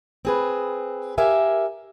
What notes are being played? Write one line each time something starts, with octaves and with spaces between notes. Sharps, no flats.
C4 G#4 B4
G4 A#4 E5 F5 G#5